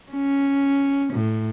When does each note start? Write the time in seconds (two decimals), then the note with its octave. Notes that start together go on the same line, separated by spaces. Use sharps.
0.12 C#4
1.13 A2